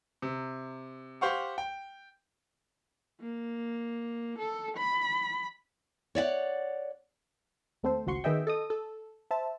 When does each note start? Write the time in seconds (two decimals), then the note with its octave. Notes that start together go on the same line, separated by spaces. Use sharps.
0.22 C3
1.21 G4 C5 F5 F#5 C#6
1.58 G5
3.21 A#3
4.39 A4
4.77 B5
6.15 C#5 D5 E5 F#5
7.83 D#2 A3 C4 A4 C5
8.06 G#1 C#2 F#4 C6 C#6
8.24 D#3 B3 G#4 D#5 E5 G5
8.47 A4 D#5 D#6
8.70 A4
9.31 C5 E5 A5